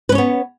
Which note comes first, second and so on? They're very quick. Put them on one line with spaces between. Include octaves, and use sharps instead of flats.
B4 C#4 C#5 B3